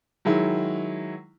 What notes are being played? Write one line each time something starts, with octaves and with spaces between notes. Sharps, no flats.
D#3 F#3 G#3 E4